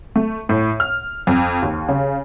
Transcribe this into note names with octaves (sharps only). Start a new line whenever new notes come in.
A3
A2
F6
F2
D#2
C#3